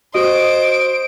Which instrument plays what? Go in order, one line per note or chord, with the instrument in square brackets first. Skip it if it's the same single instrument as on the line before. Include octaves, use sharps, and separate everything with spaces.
[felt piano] F#4 [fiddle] C5 [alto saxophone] D#5 [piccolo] D7